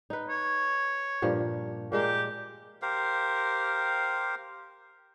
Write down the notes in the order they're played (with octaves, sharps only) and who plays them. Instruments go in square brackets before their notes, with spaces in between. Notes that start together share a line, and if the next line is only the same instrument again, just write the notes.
[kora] D#4 B4
[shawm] C#5
[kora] G2 A#2 F3
[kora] A#2 G#3 A#4 [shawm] G4
[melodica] G4 A#4 C5 F5